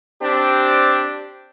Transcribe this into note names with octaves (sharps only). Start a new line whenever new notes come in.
C4 D4 G4